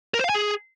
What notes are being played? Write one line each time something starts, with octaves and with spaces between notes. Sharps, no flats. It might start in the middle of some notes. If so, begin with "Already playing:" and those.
A#4
C5
F5
G#5
G#4